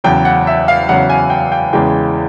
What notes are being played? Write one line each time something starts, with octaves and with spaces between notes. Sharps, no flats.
E2 C#3 F#3 G5
F#5
E5
F5
E2 C#3 F#3 F#5
G#5
G5
G5
E2 C#3 E3 G#3 G5